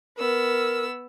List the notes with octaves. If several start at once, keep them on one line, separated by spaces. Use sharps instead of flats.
B3 A#4 E6